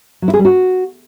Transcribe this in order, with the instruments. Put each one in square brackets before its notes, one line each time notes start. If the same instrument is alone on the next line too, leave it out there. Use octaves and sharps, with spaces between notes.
[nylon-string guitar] F#3
E4
G#4
G3
F#4